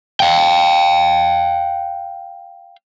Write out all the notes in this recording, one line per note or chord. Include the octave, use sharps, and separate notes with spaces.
F5 G5